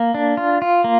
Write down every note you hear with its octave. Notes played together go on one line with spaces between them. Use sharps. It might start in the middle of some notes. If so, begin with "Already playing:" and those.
Already playing: A#3
D4
F4
F4
A#3